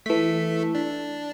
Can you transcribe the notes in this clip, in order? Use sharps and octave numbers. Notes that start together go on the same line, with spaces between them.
E3 A3 A4 B6
D4